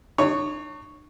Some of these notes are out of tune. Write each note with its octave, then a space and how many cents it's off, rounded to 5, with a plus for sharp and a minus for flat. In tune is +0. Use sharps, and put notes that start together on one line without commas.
D4 +45 C#5 +0